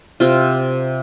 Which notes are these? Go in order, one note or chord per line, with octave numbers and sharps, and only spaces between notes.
C3 F4